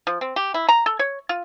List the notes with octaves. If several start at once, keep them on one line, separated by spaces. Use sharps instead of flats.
F3
C4
G4
E4
A#5
A4
C#5
F4